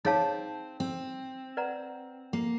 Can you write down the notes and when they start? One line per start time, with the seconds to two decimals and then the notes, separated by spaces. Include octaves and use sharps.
0.05 C4 D#4 G#4 C#5 F5 A5
0.80 C4
1.57 B4 D5 F#5 A#5
2.33 A#3